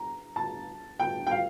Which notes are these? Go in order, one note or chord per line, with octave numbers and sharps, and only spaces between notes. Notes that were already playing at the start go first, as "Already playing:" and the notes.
Already playing: A#5
A5
G5
G5
F5